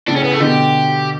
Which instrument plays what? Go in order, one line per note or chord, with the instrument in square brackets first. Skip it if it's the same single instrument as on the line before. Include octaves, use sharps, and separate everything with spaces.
[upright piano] A2 C#3 [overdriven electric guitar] D4
[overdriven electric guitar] C#4
B3
A3
[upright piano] B2 D3 [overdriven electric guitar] G4